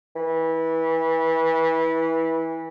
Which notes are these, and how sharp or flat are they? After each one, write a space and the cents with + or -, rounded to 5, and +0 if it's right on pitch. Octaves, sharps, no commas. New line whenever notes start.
E3 -20